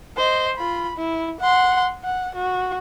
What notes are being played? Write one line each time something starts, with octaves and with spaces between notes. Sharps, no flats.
C5 D#5
F4 B5
E4
F#5 C6
F#5
F#4